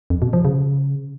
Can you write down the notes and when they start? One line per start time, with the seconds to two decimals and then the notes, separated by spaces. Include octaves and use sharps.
0.10 F2
0.22 B2
0.33 F3
0.45 C#3